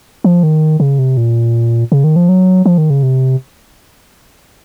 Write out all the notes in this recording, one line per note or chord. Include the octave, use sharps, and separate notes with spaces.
F3
D#3
C#3
C3
A#2
C#3
D#3
F3
F#3
F3
D#3
C#3
C3